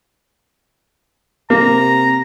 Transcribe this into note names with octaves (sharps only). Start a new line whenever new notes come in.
C3 A#3 A#5